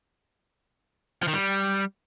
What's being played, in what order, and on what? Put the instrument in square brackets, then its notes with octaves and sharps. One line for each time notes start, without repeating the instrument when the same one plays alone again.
[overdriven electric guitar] F3
D#3
G3